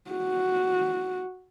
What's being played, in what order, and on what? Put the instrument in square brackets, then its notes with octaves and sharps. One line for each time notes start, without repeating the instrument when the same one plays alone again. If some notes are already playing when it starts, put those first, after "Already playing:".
[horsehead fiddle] F#4